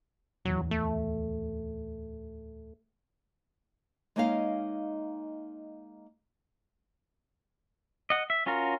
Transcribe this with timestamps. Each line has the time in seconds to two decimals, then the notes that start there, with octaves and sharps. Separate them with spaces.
0.45 D1 E2 F#3
0.71 A3
4.16 G#3 A#3 C#4 D#4 D#5 F5
8.10 D#5 F#5
8.30 E5
8.46 C#4 F4 F#4 A#4